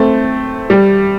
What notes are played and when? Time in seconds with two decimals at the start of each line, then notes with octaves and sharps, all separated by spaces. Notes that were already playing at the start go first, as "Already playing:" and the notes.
Already playing: A3 C4
0.70 G3